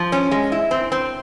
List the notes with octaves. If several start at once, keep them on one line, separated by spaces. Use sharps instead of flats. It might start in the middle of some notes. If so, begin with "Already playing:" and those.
Already playing: F3
C#4
G#3
E4
C4
C4